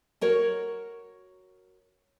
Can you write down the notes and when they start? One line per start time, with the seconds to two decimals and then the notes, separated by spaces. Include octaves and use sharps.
0.21 F#4 A#4 C#5